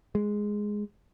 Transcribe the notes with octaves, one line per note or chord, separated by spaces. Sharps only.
G#3